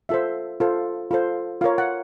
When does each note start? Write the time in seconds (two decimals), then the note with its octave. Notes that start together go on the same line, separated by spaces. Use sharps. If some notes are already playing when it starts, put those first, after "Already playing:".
0.09 F4 A4 C5 E5
0.60 F4 A4 C5
1.11 F4 A4 C5
1.61 F4 A#4 C#5 F5
1.78 F#5